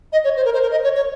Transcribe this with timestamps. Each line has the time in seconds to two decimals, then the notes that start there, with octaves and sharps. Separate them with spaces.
0.13 D#5
0.24 C#5
0.36 C5
0.45 A#4
0.54 C5
0.63 A#4
0.71 D#5
0.84 C#5
0.95 C#5